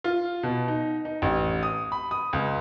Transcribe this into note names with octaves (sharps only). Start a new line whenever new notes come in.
F4
B2
D#4
D#4
A1
D#6
B5
D#6
C#2